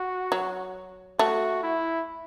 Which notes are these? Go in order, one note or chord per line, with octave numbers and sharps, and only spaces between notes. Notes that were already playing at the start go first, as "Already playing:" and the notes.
Already playing: F#4
F#3
A3 F#4
E4